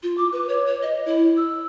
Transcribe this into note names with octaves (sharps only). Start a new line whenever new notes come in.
F4
D6
B4
C#5
C#5
D#5
E4
E6